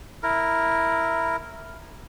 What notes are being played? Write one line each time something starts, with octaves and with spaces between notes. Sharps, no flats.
E4 A#4